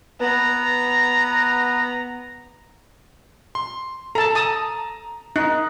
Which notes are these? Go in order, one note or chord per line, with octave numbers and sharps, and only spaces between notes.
B3 A#5
C6
A4 A5 A#5
A5 D#6
D#4 F#6